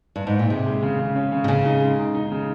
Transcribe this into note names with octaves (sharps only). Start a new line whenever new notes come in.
G2
G#2
A#2
C3 G#3
G#3
C#3
C#3
C#4
C#3
C3
C#3 G#3
D#4
G#3
D#4
D#4
C#3